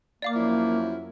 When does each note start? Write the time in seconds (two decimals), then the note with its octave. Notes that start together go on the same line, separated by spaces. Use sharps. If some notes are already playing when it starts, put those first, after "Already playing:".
0.22 A#3 D5 F5 D6
0.36 F#2 F3 E4